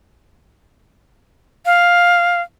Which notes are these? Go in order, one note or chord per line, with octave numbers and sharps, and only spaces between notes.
F5